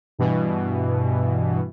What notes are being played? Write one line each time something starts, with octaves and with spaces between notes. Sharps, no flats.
G2 B2 E3